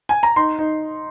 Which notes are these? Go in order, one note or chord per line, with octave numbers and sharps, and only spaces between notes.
G#5
A#5
D#4 C6
D#4